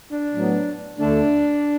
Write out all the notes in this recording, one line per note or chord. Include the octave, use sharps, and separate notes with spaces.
D4
A2 F#3 B3
D2 D3 A3 D4